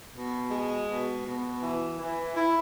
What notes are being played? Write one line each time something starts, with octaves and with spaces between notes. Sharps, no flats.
B2
G#3
B2
B2
E3
E3
E4